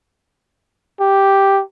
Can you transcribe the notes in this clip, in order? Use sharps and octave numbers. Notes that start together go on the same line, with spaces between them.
G4